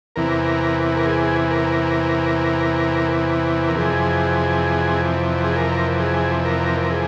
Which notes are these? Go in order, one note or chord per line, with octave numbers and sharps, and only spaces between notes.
E2 C3 E3 A#4
A#4
G#4
A#4
A#4
F2 C3 E3 G#4
G#4
A#4
G#4
A#4
A#4
G#4